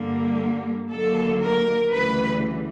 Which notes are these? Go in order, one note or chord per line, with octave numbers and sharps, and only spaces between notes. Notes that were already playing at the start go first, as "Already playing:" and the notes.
Already playing: G2 D3 G3 A#3
D#2 D3 F#3 A#3 A4
A#4
D2 C#3 E3 G3 B4